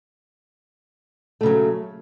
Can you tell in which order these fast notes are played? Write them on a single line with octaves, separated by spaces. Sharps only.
A3 C#3 F#3